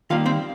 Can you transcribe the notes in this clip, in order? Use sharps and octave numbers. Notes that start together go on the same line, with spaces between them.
D#3 G3 A#3 F4 F5
C4 C5